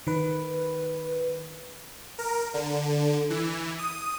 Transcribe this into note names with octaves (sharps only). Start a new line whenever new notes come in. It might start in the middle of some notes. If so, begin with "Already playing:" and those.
D#3 B4
A#4
D3
E3
D#6